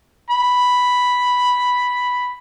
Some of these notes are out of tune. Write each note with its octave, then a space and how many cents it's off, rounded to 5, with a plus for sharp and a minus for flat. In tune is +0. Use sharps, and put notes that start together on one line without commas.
B5 +0